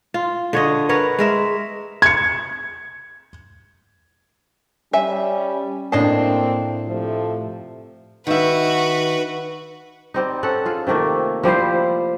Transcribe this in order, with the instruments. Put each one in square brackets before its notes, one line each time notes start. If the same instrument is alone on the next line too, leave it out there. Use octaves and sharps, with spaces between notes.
[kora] F4
D3 C#5 D#5
A#4 B4 C#5 F#5
G#3 A#4 E5
[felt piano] G#6 C#7
[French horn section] G3 C#4 [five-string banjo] E5 G#5
[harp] A2 C7 [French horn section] A#3 C4 [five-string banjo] D4 D#5 A5
[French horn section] C3 F3 A3
[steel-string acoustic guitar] D#3 E5 [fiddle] F#4 B4
[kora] G3 C4 D#4
C#4 A4 F#5
F4 G#4
C3 D#3 A3 A#3
F3 G3 E4 C5